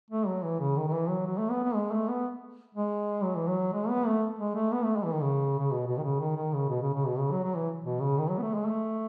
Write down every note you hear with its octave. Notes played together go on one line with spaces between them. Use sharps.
A3
F#3
E3
C#3
D#3
D#3
E3
F#3
F#3
A3
B3
B3
G#3
A3
B3
G#3
F#3
E3
F#3
G#3
B3
A3
G#3
A3
B3
A3
G#3
E3
D#3
C#3
C#3
B2
B2
D#3
C#3
D#3
D#3
C#3
B2
C#3
C#3
B2
C#3
F#3
F#3
E3
B2
C#3
D#3
F#3
B3
A3
G#3
A3